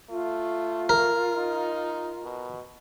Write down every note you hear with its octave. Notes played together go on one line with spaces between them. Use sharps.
A3 F4
A#4
D#4
B2